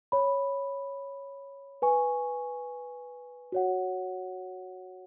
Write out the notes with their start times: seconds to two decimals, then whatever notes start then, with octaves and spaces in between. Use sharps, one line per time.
0.12 C#5 B5
1.82 B4 G#5 C#6
3.52 F#4 C#5 F#5